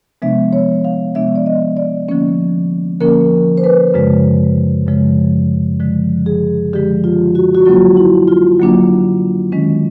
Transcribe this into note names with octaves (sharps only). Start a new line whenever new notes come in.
C3 F3 G#3 B3 D4 E5
C#5
F5
C3 F3 G#3 B3 D4 E5
D5
D#5
D5
D3 F3 A#3 C#4
D3 F3 A#3 C#4 A#4
C5
B4
F#2 C#3 F3 G#3
F#2 C#3 F3 G#3
D3 F3 G#3
G#4
D3 F3 G#3 G4
F4
F#4
F#4
D3 F#3 A#3 D4 F4
E4
F4
D3 F#3 A#3 D4
D#3 G#3 C#4